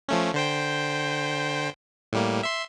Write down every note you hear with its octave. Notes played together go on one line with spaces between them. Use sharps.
F3 A3 C#4
D3 C5 G5
A2 G3 A#3
E5 C6